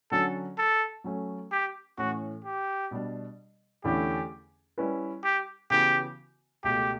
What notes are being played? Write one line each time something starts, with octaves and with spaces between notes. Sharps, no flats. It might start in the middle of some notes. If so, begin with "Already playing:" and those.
D3 F#3 C#4 F#4 A4
A4
F#3 A3 C#4
G4
A2 E3 A3 C#4 F#4
G4
B2 G3 D4
E2 D3 A3 C#4 E4 G4
G3 C#4 E4 B4
G4
C#3 E3 B3 F#4 G4
C#2 B2 A3 G4